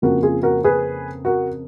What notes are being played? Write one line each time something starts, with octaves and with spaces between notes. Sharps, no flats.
F2 C#3 F3 A#3 F#4 A#4
F4 G#4
F#4 A#4
G#4 B4
F#4 A#4